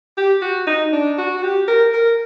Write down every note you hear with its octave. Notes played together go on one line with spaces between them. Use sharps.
G4
F#4
D#4
D4
F#4
F#4
G4
A#4
A#4